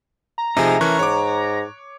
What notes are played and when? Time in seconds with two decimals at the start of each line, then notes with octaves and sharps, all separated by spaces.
0.38 A#5
0.57 C3 F3 A3 D#4 G#4
0.81 E3 C#4 A#4 C#6 F#6
0.99 G#2 C#5 D6